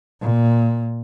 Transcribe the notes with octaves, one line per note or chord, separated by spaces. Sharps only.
A#2